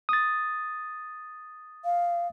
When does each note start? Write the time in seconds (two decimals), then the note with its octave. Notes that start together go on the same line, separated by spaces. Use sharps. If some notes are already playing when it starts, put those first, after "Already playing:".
0.09 D#6 A6
1.85 F5